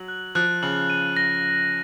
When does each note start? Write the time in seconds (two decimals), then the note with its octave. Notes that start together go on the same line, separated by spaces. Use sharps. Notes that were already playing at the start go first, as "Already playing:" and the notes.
Already playing: F#3 F#7
0.08 F#6
0.35 F3 F#6
0.63 C#3 F#7
0.90 D#7
1.17 A#6